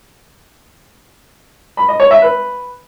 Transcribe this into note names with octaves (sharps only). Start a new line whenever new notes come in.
B5
D#5
C#5
E5
B4